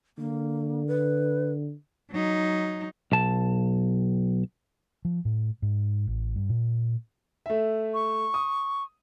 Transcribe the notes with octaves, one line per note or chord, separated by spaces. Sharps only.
D3 A#3
B4
F#3 D#4
B1 A5
F3
A2
G#2
A1
G2
A#2
A3 E5
C#6
D#6